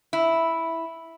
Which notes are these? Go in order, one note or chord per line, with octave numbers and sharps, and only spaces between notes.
E4